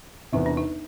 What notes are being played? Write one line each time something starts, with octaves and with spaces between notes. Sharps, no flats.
E1 E2 C3 D#4
D4
D#4